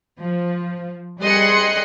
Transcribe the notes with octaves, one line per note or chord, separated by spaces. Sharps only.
F3
G3 G#4 D#5 C6 F#6 C#7